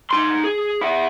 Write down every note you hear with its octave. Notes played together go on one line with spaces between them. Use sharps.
D#4 C6
G#4
E4 F#5